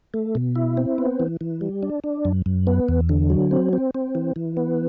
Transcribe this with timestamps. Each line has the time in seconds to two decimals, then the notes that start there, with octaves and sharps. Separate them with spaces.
0.14 A3
0.35 B2
0.56 E4
0.77 C4
0.98 B3
1.20 E3
1.41 E3
1.61 G3
1.83 D4
2.04 D4
2.25 F#2
2.46 F#2
2.67 B3
2.89 E2
3.09 D3
3.30 F#3
3.51 C4
3.73 C4
3.95 C4
4.15 E3
4.36 E3
4.57 B3